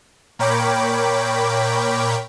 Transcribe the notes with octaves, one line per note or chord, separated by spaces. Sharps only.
A#2 A#4 C#5 G5 B5 D6